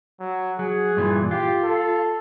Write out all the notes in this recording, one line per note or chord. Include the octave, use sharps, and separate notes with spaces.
F#3
F#3 G#4
G2 A#2 E3
F4 G4
A4